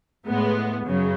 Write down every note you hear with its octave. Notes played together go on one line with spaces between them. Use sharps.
A2 G#3 B3
F#2 C#3 F#3